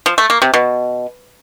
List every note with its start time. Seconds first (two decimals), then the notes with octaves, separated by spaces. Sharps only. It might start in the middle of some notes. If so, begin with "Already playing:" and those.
0.06 F3
0.18 A3
0.30 A#3
0.42 C3
0.54 B2